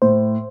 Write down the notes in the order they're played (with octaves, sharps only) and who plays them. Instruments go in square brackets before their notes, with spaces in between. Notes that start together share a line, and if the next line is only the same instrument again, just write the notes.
[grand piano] A2 [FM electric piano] C5